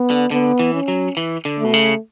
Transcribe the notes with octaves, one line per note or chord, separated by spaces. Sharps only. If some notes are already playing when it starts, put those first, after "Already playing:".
Already playing: B3
D3
D3 B3
E3
C#4
F#3
E3
D3
A3
B2
C#3